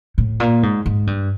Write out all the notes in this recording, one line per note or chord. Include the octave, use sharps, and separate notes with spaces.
A2
A#2
G#2
G#2
G2